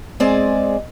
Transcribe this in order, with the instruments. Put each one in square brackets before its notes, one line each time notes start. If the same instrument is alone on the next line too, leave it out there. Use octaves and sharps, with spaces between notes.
[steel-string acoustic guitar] G#3 C4 G#4 D5